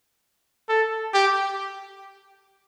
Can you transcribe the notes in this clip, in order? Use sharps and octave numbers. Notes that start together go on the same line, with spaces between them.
A4
G4